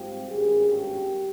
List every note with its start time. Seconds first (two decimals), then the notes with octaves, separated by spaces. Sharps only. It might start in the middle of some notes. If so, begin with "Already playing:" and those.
Already playing: G#2 G3 C4 F4 G4
0.30 G#1 G2 G3 A#3 C#4 G#4
0.68 G4